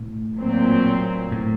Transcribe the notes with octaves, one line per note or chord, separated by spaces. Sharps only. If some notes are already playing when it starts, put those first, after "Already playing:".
Already playing: A2
A#2 F#3 C4
A2